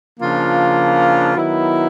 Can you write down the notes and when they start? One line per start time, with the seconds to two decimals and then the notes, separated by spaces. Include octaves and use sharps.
0.19 C#3 F3 A#3 D4 F4
1.35 D#3 F#3 B3 E4